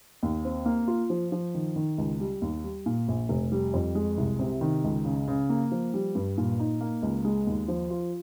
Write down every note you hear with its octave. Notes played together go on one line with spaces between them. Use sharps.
D#2
C4
A#3
F4
F3
F3
D#3
D#3
C#2
G3
D#2
G3
A#2
A#1
F1
G3
F2
G#3
C2
C3
D#3
C#2
C#3
C#3
A#3
F3
G3
G2
A#2
D#4
A#3
C#2
G#3
D#2
F3
F4